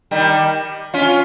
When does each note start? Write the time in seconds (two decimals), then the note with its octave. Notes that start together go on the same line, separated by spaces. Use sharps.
0.11 D#3 G3
0.94 C#4 F4